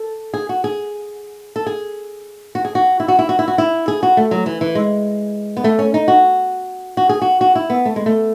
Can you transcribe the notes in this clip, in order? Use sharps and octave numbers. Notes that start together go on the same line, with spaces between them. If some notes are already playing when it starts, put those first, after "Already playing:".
Already playing: A4
G#4
F#4
G#4
A4
G#4
F#4
G#4
F#4
E4
F#4
E4
F#4
E4
F#4
E4
G#4
F#4
A3
F#3
E3
E3
G#3
B3
A3
C#4
D#4
F#4
F#4
G#4
F#4
F#4
E4
B3
A3
G#3
A3